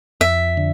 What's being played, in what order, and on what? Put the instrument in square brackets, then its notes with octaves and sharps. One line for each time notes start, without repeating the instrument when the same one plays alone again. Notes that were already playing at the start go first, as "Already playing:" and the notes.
[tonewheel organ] F2 [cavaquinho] E5
[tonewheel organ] D3